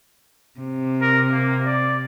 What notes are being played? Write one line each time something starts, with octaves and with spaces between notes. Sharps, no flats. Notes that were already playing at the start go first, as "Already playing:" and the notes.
C3
A#4
A#3
D5